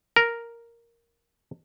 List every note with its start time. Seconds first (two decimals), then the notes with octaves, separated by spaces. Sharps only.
0.16 A#4